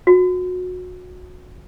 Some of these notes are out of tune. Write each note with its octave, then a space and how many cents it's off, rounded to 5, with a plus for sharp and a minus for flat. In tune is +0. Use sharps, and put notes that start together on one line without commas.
F#4 -30